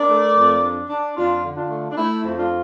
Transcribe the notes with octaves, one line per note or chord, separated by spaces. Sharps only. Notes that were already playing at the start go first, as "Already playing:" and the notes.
Already playing: D4 A#4 D5
A3
F2
D4
D4
F2 D4 F4
D3
D4 F4
A3
D4
A3 E4
F2
D4 F4